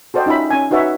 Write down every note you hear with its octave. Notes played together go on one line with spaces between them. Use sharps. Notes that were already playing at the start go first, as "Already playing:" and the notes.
F#4 A4 C5 D5 D#5 G5
C#4 D#4 F4 E5 B5
C#4 G#5
D#4 F#4 B4 C#5 E5